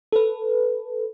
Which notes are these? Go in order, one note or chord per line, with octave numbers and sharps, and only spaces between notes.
A4 B4